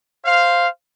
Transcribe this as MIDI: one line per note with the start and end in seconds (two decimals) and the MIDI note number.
0.25 0.67 72
0.25 0.67 77